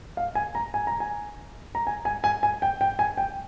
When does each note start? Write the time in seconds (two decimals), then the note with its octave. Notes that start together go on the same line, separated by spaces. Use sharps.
0.17 F5
0.35 G#5
0.55 A#5
0.74 G#5
0.87 A#5
1.00 G#5
1.75 A#5
1.87 G#5
2.05 G#5
2.24 G#5
2.43 G#5
2.62 G5
2.81 G5
2.99 G#5
3.17 G5